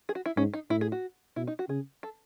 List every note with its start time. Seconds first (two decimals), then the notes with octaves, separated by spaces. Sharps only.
0.09 G#4
0.15 F#4
0.26 E4
0.37 G#2 C#4
0.54 D#4
0.70 A2 E4
0.81 G#4
0.92 F#4
1.36 B2 E4
1.47 D#4
1.59 F#4
1.69 C#3 G#4
2.03 A4